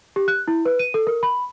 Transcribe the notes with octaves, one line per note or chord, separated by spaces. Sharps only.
G4
F#6
E4
B4
D#7
A4
A#4
B5